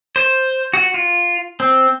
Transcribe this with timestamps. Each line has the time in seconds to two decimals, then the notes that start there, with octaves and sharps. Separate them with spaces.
0.16 C5
0.74 F#4
0.94 F4
1.60 C4